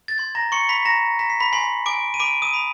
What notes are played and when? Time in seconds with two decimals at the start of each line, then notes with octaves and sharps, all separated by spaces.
0.08 A6
0.18 C6 G#6
0.35 A#5 A#6
0.52 C6 C#6 C#7
0.69 B5 B6
0.85 A#5 A#6
1.19 A#5 B6
1.30 C7
1.40 B5 B6
1.52 G#5 C6 C7
1.86 G#5 D6 D7
2.14 D#7
2.19 B5 D6 D7
2.42 D#6 D#7
2.54 B5